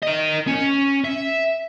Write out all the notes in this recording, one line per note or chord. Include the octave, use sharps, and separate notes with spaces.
A#4 D#5
C#4
E5